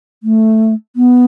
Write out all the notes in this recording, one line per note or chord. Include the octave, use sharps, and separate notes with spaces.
A3
B3